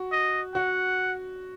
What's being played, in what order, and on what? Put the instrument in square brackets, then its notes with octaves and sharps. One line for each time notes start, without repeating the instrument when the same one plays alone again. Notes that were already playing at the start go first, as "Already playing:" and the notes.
Already playing: [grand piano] F#4
[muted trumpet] D#5
[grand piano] F#4 [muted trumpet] F#5